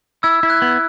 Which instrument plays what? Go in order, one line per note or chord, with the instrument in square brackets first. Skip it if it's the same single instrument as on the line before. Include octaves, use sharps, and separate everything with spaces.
[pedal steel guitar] E4 [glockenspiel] E6 G#6
[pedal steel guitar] E4
[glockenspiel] F#6
[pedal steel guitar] B3